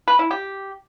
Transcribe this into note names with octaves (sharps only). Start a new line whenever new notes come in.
B4
E4
G4